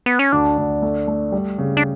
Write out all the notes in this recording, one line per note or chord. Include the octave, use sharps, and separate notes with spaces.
B3
C#4
D2 D4
D2
A3
A3
G3
C#3
D4